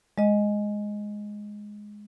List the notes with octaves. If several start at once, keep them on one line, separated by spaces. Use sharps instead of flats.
G#3 D#5